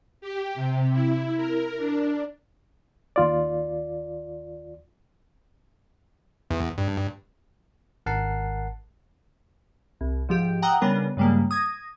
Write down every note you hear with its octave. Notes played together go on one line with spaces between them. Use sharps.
G4
C3
E4
A#4
D4
D#2 F4 D5
E2
G2
G#1 A#4 F#5 A5 C7
C2
G#2 F3 G4 D7
F#5 G5 A#5 D#6 E6 F#6
C#3 G3 B3 D4 A#4
G2 C#3 G3 G#3 A#3
D#6 G#6 A#6